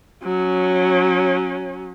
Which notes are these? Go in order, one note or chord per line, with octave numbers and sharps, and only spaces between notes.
F#3 C#4